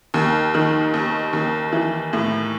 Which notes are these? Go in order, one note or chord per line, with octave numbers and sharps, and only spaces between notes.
D#2
D#3
D#2
D#2
E3
A2